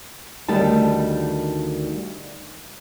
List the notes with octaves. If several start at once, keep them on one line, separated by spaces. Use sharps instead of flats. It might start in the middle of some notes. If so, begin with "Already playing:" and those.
D2 D#3 G3 A5